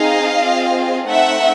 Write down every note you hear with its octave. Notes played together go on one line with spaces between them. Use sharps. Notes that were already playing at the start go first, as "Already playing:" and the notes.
Already playing: C4 D#4 G#4 D#5 F5
C4 F4 G#4
A3 C4 D#4 E5 F#5